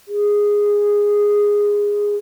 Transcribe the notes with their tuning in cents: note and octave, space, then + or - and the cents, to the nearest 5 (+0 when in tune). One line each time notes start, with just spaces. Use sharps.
G#4 -10